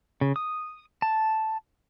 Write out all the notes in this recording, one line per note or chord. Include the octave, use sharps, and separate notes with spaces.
C#3
D#6
A5